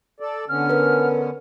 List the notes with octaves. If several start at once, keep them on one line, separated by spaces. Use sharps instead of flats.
A4 D5
D3 B3 C#4 F6
A#4 B4